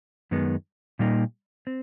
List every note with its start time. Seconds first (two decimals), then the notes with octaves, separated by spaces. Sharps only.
0.31 F#2 D#3 G#3 B3
0.99 A#2 G3 A#3 D#4
1.67 C4